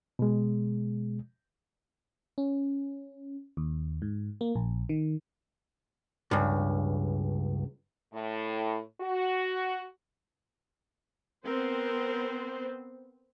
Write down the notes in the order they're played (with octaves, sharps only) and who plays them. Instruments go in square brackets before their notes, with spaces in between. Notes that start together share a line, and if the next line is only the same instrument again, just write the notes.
[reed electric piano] B2 G#3
[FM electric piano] C#4
D#2
G#2
A#3
A#1
D#3
[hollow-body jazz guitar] C#2 G2
[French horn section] A2
F#4
[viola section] B3 C4 C5 [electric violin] A#4